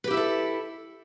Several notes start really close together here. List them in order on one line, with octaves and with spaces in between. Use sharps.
B4 G4 E4 E5 A4